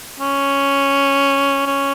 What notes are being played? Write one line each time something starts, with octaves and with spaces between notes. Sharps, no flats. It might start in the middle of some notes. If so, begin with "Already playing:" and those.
C#4
C#4